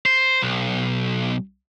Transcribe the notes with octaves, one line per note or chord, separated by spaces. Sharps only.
C5
B1